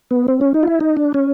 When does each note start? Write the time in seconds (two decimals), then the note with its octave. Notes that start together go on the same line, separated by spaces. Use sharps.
0.11 B3
0.28 C4
0.41 C#4
0.54 D#4
0.63 F4
0.67 E4
0.80 D#4
0.97 D4
1.14 C#4